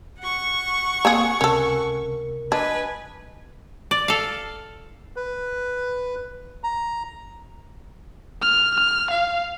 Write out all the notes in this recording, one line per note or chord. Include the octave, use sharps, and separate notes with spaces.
F#5 C#6
A#3 C4 G#4
C#2 C3 C#4 A4 A#4
D4 B4 D#5 G#5 A5 G#6
D5
A4 F5
B4
A#5
F6
F6
F5